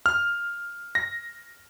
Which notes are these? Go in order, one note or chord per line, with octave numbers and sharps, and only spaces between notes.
F6
A#6